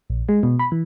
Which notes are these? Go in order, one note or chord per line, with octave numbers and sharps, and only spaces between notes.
A#1
G#3
B2
B5
E3